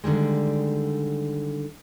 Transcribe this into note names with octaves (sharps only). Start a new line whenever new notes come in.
D3 D#3 G3 G#3